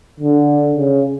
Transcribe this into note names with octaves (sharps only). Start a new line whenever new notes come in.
D3
C#3